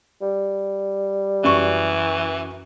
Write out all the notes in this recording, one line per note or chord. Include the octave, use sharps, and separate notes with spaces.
G3
F#2 E3 C#6